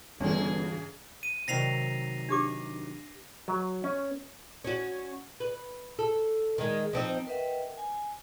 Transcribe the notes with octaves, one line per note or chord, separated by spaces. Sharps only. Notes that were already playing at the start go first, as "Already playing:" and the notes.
G1 G2 C#3 E3 G3 C#4 G#4
D#7
C3 D#3 F#3 A#6 C7 F7
D4 G4 D6
F#3
C#4
C#4 F#4
B4
A4
D#3 G#3
F3 C4 D#4
A#4 B4 D#5 E5 F#5 G5
G#5